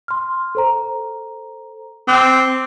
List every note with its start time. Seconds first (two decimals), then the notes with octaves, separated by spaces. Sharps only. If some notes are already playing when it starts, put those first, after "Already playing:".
0.08 C6 F6
0.55 A4 C5 A#5
2.08 C4 D6 F#6